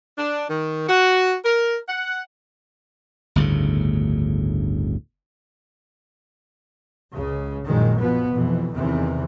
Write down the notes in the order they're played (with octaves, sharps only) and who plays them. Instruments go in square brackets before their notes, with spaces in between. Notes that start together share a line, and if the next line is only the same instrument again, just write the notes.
[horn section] D4
D#3
F#4
A#4
F#5
[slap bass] G1 D2 A2 C#3
[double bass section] C#2 C#3
A#1 F#2 A#2 D#3 G#3
B2 F3 B3
F2 B2 E3
E2 C3 D#3 E3